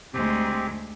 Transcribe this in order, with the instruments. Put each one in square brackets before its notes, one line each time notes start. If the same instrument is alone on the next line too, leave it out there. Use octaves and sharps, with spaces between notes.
[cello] D2 G#3 [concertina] C4 G4